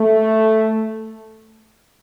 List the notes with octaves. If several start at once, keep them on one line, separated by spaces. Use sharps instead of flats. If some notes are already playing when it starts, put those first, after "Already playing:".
Already playing: A3